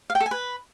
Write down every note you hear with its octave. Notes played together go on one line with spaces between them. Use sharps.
F5
G5
A4
G#5
B4